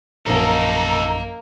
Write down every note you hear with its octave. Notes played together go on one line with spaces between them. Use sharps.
A#1 F#2 A#3 D#4 A4 A#5